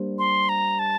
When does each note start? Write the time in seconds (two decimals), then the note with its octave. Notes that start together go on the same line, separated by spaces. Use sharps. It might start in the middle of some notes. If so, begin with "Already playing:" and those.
Already playing: G3 A#3 D4 G4 C5
0.19 C6
0.49 A#5
0.79 A5